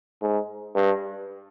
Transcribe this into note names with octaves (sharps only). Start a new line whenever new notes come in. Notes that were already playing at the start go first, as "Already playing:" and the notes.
G#2
G2